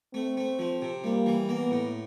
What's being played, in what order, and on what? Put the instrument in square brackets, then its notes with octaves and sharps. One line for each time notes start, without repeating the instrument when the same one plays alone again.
[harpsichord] A3 [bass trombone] C4
[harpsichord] A3
F3
C3
[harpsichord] G3 [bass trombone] A#3
[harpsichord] E3
[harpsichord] A#3 [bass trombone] B3
[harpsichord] A2